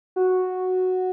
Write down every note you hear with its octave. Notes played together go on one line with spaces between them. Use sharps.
F#4